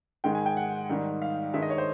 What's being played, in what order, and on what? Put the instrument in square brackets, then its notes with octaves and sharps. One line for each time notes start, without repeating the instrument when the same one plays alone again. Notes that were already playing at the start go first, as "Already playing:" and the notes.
[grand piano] G#2 D#3 G#3 G5
G#5
G5
F#5
G#2 D#3 G3
F5
G2 D#3 G#3 E5
D#5
C#5
C5